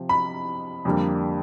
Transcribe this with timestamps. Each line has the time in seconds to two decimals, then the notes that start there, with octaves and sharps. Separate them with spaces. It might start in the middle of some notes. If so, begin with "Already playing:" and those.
Already playing: C3 F3
0.09 B5
0.85 F2 D3 G3 A#3